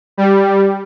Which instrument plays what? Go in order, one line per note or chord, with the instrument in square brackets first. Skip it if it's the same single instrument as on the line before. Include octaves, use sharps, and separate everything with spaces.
[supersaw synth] G3